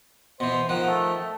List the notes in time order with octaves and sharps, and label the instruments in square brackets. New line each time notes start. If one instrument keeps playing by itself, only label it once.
[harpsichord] B2 E3 [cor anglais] C5
[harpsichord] D#3 F3 [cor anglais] F#5
[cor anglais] A3
A3